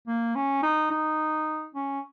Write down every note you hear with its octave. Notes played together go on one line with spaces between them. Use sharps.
A#3
C#4
D#4
D#4
C#4